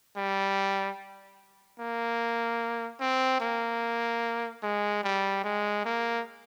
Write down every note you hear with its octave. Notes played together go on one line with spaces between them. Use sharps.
G3
A#3
C4
A#3
G#3
G3
G#3
A#3